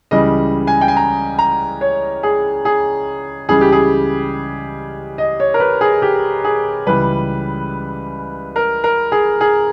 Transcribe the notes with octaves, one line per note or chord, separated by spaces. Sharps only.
C#2 C#3 E3 G3 D#5
G#5
G5
G#5
A#5
A#5
C#5
G#4
G#4
C#2 C#3 E3 G3 G#4
G4
G#4
D#5
C#5
A#4
B4
G#4
G4
G#4
C#2 C#3 E3 G3 B4
A#4
A#4
G#4
G#4